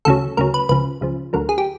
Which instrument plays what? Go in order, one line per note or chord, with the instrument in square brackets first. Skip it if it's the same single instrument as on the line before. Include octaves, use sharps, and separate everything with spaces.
[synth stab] D2 C#3 F#3 A4
D2 C#3 F#3 A#4
B4
C#2 C#3 F3 B4
C#2 C#3 F3
D2 D3 F#3 A#4
G#4
G4